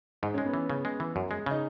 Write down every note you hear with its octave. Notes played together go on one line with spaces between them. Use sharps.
G#2 D#4
C#4
G#3
B3
E3
C#3
G#3
E3
F#2
G#3
C#3 D#4